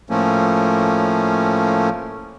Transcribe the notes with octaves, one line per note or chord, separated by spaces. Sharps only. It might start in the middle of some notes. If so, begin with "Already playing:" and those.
A2 F3 A3 A#3 C#4